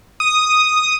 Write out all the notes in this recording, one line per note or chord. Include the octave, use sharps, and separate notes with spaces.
D#6